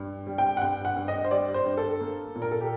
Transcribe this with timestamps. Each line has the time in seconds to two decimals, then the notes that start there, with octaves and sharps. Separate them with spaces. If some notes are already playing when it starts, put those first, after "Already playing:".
Already playing: G2
0.27 G3
0.38 G5
0.57 F#5
0.61 G2 G5
0.85 F#5
0.96 G2
1.08 D#5
1.24 C5
1.31 G3 D5
1.54 C5
1.65 G2
1.77 A4
2.01 A#3
2.35 A#2
2.42 A#4
2.51 A4
2.61 G4